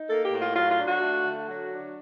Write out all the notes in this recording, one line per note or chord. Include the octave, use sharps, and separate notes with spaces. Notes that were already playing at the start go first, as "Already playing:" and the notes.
Already playing: D#4
A#3 A4
G4
A2
F4
F#3 F4
F4
D4
F#4
A3
D3
F#3 F#4
D4